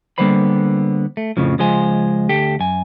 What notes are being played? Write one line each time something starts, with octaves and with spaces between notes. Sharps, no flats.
D3 G3 A#3 B3 C5 B5
A3
F2 A2 C#3 F3
C#2 F3 G#3 F4 C5 G#5
D2 G4 A4 G5
F#2 G#5